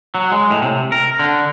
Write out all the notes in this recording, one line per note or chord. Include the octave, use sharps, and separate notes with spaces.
F#3
G#3
A2
C3
A#4
D3